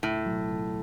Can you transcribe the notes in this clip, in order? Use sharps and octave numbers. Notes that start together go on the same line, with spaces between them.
C#2 A2
B2 F#3
C#2